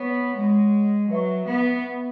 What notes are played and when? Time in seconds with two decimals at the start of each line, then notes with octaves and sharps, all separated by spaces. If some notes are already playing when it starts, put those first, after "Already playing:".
Already playing: B3 C#5 F#5 C#6
0.38 G#3
1.10 F#3 B4 E5 C#6
1.47 B3